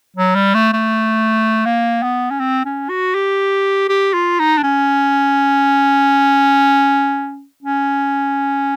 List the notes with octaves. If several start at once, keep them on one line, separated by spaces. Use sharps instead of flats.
F#3
G3
A3
A3
A#3
B3
C#4
C4
C#4
F#4
G4
G4
F4
D#4
D4
C#4
C#4